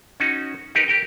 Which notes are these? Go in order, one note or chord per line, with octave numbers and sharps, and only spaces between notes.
C#4 D#4 F#4
D#4 G4 A#4 B4
G4 A#4 G5